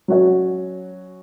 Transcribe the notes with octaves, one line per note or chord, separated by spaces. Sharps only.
F#3 C#4 F#4 C#5